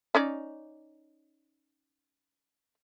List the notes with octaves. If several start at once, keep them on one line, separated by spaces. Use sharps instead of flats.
C#4 D#4 D5